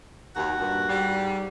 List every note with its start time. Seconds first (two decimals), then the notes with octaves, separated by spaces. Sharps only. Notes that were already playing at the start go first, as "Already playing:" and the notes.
0.36 D#2 F#4
0.58 G2 A#2
0.87 G#2 G3